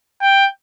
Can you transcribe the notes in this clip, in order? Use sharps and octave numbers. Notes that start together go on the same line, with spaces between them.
G5